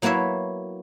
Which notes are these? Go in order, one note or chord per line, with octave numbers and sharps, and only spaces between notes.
F#3 A#3 B3 E4 C#5 E5